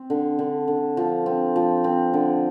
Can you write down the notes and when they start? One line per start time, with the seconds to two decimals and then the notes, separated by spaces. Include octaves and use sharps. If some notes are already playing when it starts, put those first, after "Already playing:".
Already playing: C4
0.10 D3
0.39 D3
0.68 D3
0.97 F3
1.26 C4
1.56 F3
1.84 C4
2.14 D3